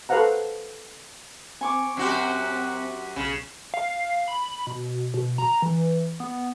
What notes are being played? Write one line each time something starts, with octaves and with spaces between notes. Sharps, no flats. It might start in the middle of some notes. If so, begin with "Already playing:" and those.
A4 B4 C5 F5 F#5 A#5
C4 G#5 C#6 D6
F#2 F#4 G4
B1 C#3
F5
B5
B2
B2
A#5
E3
B3